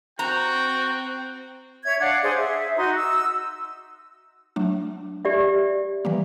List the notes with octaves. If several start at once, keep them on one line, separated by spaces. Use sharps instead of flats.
C4 F#4 G5 A#5
C#5 E5 G#6
D4 F5 F#5
D4 G#4 C5 C#5
E5
D#4 F#4 C6
E6
F#3 A3 D4
G4 D5 E5
E3 G3 A#3